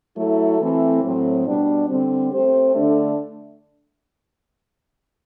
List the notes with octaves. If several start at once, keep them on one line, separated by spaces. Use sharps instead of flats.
F#3 A3 E4 A4
E3 A3 C4
A2 F#3 A3 C4
B2 G3 B3 D4
D3 G3 C4
A3 C4 G4 C5
D3 A3 D4